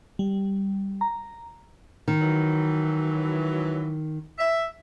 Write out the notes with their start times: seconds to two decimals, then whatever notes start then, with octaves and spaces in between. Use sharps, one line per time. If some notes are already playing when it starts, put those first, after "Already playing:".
0.19 G3
1.01 A#5
2.08 D#3
2.21 E3 F#3
4.38 E5